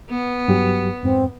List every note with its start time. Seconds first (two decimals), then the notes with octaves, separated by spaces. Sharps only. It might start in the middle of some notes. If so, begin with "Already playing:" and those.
0.10 B3
0.48 G2 F#3 G4
1.03 F2 G#2 C4